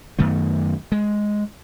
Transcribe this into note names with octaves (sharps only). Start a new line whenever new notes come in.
F#2 D#3 A3 B3
G#3